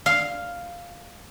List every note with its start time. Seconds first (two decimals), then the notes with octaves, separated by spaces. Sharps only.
0.06 F5